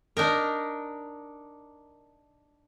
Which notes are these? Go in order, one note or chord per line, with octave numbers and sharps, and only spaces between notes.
D4 D#4 A#4